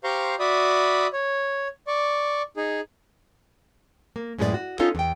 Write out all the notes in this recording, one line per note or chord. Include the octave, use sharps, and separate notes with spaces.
G4 C5 F5 A#5 C6 C#6
F#4 D5 E5 B5 D#6
C#5
D5 C#6
D#4 G#4
A#3
F#2 A2 G#3 B3 A4 D5
F#4
B3 C#4 D#4 F4 A4 C#5
E2 G5